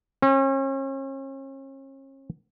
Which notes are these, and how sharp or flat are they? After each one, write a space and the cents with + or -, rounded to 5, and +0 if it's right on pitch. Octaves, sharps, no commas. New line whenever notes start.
C#4 -40